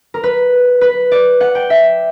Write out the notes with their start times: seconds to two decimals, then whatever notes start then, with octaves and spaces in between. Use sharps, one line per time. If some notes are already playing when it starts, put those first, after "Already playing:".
0.14 A#4
0.23 B4
0.81 B4
1.11 D5
1.40 F#5
1.55 G5
1.70 E5